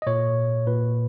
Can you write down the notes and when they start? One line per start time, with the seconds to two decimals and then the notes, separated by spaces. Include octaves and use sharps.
0.02 D#5
0.07 A#2 C#5
0.67 A#2 B4